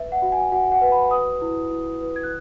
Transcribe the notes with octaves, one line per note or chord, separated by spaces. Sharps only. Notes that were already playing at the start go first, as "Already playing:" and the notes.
Already playing: B4 E5
F#5
F#4
G#5
F#4 F#5
F#5
B4
B5
B4 D#6
E4
E4
B4
G#6
F#6